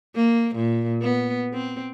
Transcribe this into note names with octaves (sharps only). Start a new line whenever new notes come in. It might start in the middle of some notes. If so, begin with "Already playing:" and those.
A#3
A#2
B3
C4